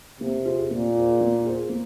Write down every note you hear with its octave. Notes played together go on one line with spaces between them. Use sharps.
C3 A#3
F4 G#4 C5
A#2 A#3
F4 G#4 C5
A#3
F4 G#4 C5
A#3